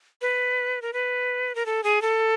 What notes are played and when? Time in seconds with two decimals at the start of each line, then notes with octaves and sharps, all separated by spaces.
0.22 B4
0.82 A#4
0.93 B4
1.55 A#4
1.66 A4
1.84 G#4
2.02 A4